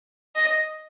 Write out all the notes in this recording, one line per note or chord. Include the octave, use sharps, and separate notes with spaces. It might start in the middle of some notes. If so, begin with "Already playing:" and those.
D#5